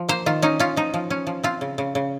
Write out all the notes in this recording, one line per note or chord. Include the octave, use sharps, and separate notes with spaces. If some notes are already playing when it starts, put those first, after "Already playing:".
Already playing: F3
A#3 C5
D#3 F4
C#4 D#4
C#4 F4
F3 D#4
F3
C#4
F3
C4 F4
C#3
C#3
C#3